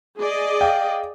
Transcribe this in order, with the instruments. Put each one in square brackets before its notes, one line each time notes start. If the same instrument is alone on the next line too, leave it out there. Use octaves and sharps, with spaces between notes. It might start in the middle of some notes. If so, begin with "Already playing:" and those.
[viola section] G#4 D5 D#5
[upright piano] F5 G5